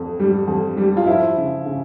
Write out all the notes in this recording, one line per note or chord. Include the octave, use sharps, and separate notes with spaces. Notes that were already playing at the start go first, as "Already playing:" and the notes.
Already playing: F2
G3
F2
G3
F4
F3 E4
C#3
C#3